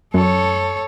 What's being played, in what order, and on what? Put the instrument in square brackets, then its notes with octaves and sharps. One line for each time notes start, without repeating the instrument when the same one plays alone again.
[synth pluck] F#2 [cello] A4 C#5